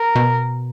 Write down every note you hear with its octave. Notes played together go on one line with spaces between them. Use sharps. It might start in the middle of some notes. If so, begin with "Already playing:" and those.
Already playing: A#4
B2